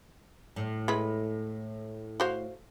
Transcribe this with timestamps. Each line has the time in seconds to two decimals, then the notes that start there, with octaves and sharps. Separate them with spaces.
0.56 A2
0.88 G#3 E4 B4
2.20 F#4 C5 F5